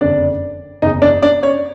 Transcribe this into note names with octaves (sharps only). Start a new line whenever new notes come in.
F#1 F2 D3 D4 D5
F#1 E2 C#3 D#4 D#5
D4 D5
D4 D5
C#4 C#5